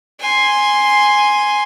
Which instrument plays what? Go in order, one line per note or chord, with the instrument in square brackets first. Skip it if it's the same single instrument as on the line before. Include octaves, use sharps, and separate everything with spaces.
[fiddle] G#5 C6